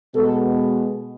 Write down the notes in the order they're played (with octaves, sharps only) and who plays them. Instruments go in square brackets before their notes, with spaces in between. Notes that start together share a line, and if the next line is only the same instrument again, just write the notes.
[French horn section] B2 G#3 B3 A4